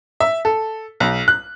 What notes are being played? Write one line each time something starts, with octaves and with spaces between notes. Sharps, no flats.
E5
A4
B1
F#6